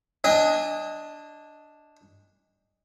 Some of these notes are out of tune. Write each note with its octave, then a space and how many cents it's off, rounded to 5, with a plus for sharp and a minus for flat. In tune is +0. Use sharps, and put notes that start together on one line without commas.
D4 +0 D#5 +10 G#5 -35